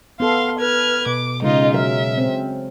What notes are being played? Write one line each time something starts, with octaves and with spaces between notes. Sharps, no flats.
B3 A4 F5 C6
B4 F6 G#6
B2 D6
C#3 G#3 D#4 F4 D#5
F#3 A#4 E5 F5
C4